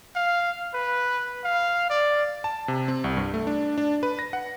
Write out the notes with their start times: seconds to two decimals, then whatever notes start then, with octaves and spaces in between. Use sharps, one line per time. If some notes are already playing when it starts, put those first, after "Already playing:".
0.15 F5
0.74 B4
1.44 F5
1.90 D5
2.44 A5
2.68 C3
2.88 C4
3.04 C2
3.17 G2
3.34 A3
3.47 D4
3.78 D4
4.03 B4
4.19 A#6
4.33 F#5